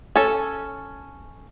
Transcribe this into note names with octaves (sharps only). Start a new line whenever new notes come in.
C#4 A4